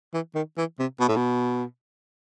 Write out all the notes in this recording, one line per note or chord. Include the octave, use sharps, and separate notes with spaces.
E3
D#3
E3
C3
B2
A2
B2